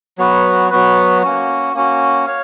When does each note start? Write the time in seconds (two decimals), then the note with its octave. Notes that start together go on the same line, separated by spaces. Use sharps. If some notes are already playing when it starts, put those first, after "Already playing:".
0.18 F#3 B3 F#4 B4
0.70 F#3 B3 F#4 B4
1.22 A#3 C#4 F#4
1.74 A#3 C#4 F#4
2.26 C#5 F5